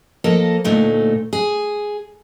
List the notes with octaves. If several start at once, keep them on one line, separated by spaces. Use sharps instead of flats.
F3 A#3 A4 A#4 D#5
D2 A#2 A3 D#4
G#4